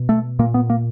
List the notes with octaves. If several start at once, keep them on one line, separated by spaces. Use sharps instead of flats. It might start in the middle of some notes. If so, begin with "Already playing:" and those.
Already playing: B2
A3
A#2 A#3
B3
A#3